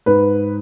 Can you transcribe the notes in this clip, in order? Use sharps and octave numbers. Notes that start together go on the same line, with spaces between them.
G#2 B4